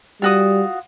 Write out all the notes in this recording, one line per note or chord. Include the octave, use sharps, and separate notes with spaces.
G3 F4 F#4 D#6